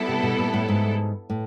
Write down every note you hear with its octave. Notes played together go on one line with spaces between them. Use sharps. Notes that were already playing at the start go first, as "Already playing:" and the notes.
Already playing: G3 B3 E4 A4
C3
B2
A#2
A2
G#2
A2